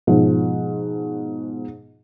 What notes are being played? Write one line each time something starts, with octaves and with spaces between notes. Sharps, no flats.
G#2 B2 F3